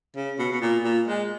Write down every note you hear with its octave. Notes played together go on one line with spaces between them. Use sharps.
C#3
B2
B2
A#2
A#2
G#3